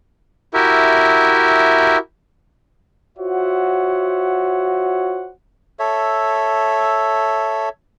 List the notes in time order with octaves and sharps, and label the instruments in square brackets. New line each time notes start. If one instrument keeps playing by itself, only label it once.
[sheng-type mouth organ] E4 F#4 G4 A#4 E5
[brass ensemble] F4 F#4 C5 C#5 E5 F#5
[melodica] A4 C#5 E5